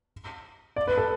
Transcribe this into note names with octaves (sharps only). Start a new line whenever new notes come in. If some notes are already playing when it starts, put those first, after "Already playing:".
D5
B4
A4